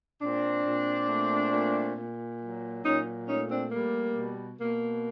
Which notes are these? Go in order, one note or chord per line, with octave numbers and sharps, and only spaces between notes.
A#2 C4 D4
A#2
A3
A#2
A#2
F#3
A#2 C#4 D#4
A3 C#4 D#4
C4 D4
G3 A#3
B2
B2 A#3